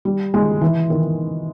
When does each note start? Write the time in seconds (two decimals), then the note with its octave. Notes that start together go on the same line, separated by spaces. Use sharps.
0.05 G3
0.34 G#3
0.61 E3
0.90 D#3